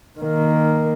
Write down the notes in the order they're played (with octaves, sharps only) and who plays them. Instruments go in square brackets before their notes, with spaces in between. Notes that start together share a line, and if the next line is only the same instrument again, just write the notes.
[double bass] D#3 A#3